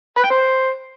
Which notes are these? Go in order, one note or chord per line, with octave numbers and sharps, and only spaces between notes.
B4
G5
C5